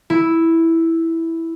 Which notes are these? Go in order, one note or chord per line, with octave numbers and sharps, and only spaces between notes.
E4